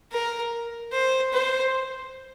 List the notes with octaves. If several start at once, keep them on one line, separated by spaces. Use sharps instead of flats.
A#4
C5
C5